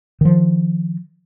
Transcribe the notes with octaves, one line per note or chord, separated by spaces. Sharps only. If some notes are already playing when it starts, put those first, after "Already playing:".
D#3 F3